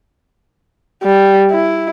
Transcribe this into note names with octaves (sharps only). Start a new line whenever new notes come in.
G3
E4